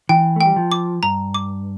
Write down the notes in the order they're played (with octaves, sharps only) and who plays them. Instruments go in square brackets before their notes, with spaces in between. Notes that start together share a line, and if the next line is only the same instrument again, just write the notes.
[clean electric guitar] E3 [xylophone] G5
[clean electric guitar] A3
[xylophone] G5
[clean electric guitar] G3
F3
[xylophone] D6
[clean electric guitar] G2 [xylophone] A#5
[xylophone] D6